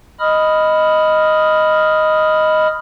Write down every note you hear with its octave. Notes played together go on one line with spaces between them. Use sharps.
D#5 B5 D#6 F6